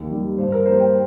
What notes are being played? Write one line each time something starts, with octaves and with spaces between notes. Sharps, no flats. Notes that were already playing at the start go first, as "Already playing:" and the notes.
Already playing: D#2
D#3 G3
G2 C5
A#4
G3 A#3 C5
G5